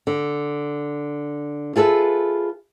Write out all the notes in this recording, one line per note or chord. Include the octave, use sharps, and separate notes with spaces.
D3
F4 G#4 A4 B4 E5